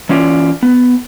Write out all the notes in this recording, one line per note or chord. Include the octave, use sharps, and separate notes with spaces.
E3 C#4 F4 D5
B3